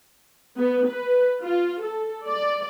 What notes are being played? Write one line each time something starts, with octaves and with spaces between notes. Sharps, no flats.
B3
B4
F4
A4
D5